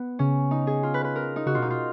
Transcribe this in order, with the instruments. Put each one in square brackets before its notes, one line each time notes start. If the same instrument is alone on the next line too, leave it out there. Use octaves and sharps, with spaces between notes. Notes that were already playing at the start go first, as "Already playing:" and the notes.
Already playing: [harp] B3
[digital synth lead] C#3 [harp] C#4
[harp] D#4
G#4
F4
B4
B4
A#4
D#4
[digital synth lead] C#3 [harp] F#4
[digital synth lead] B2 [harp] F4
[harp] D#4
[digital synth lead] B2
[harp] F4